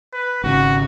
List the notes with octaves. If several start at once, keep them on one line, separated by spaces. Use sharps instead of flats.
B4
G#1 C#3 F#4